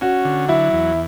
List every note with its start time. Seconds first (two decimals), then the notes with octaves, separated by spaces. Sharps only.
0.01 C#4 F#4
0.25 D3
0.48 F#3 E4
0.73 E2